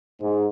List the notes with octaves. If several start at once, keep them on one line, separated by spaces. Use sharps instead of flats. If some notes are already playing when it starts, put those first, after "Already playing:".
G#2